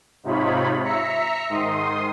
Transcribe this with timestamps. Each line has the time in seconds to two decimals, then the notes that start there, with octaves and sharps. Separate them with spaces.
0.24 G#2 C3 D#4 F4 C#5 B5
0.84 E5 A#5 B6 C#7
1.50 G#2 D#3 C6 D#6